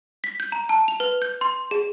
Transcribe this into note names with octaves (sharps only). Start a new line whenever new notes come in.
B6
G6
A#5
A5
F7
B4
G6
C6
G#4